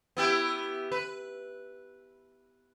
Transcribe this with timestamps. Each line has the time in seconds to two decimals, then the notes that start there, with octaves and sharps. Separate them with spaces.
0.17 B3 E4 G4
0.92 B4